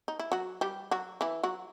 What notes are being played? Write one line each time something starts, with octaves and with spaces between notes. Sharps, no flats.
D#4
E4
F#3 F#4
G3 G4
F#3 F#4
E3 E4
F#3 F#4